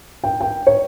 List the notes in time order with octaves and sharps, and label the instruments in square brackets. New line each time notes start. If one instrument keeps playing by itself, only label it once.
[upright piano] G5
G5
C#5